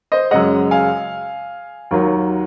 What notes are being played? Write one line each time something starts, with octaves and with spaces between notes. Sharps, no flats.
C5 D#5
F#2 C#3 G#3 D#5 F#5
F5 G#5
D#2 D#3 F#3